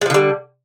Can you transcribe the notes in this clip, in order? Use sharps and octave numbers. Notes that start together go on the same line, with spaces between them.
D3 F3 G3 G#3